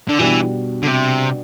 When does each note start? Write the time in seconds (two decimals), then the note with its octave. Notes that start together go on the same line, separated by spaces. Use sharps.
0.09 D3
0.19 B2 E3 G3 D4
0.83 D3
0.87 C3